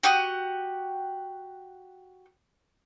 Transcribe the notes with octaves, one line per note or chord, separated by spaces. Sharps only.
F#4 G4 F#5 D#6